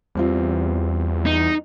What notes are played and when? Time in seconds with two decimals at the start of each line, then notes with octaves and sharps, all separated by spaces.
0.15 E2 G3 C4 F4
1.26 D#4